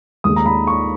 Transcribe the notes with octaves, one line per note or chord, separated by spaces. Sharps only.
D#2 D#3 G#3 D#6
A#5
B5
C#6